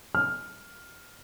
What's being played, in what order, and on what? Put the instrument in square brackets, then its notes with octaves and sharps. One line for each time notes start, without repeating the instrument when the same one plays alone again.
[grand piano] F6